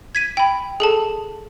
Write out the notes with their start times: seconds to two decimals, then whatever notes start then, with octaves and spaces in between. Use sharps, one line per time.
0.15 G#6 B6 D#7
0.37 G5 B5
0.80 G#4 A4 A5